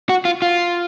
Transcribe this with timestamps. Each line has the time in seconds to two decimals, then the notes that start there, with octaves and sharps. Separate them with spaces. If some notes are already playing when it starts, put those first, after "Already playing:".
0.09 F#4
0.25 F4
0.42 F4